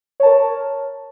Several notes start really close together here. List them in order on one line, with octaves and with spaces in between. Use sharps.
C#5 A5 A#4